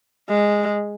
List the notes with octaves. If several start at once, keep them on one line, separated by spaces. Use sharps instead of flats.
G#3